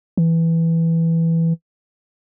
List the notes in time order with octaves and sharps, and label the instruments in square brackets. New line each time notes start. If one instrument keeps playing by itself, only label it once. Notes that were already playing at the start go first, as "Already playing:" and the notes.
[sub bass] E3